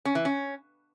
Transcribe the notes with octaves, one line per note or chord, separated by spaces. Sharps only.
C#4
E3
C#4